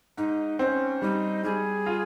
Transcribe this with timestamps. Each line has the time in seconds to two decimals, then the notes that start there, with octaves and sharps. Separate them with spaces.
0.17 G#2 D#4
0.59 C4 C#4 D#4
1.02 G3 D#4
1.44 G3 G#4
1.86 F4